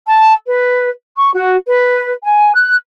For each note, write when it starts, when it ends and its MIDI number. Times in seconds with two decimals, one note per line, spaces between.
0.06 0.33 81
0.47 0.89 71
1.16 1.30 85
1.35 1.55 66
1.66 2.13 71
2.24 2.54 80
2.54 2.76 90